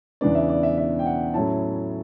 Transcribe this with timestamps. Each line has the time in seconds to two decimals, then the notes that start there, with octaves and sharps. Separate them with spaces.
0.21 E2 C#3 E3 B3 D4 D5
0.35 E5
0.49 D5
0.63 E5
0.78 E5
0.99 G5
1.06 F#5
1.34 A2 F#3 C#4 E4 A5